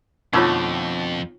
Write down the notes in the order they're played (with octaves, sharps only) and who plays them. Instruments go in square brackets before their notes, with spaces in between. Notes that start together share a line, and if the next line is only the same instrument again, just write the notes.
[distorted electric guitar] F2 [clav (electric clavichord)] B2 D3 A3 [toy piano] D#4 F4 C#5